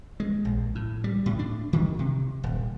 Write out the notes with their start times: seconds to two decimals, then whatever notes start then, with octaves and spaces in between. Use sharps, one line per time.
0.20 G#3
0.45 A#1
0.75 A2
1.04 G3
1.26 A2
1.39 D4
1.73 D#3
1.99 C3
2.44 D#1